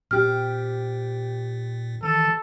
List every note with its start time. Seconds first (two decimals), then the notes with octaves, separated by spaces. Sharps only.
0.11 A#2 C4 G4 F6
2.03 D#3 E3 A4